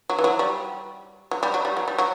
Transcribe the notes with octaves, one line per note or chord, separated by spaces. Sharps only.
F#3
E3
F#3
G3
F#3
G3
F#3
G3
F#3
G3
F#3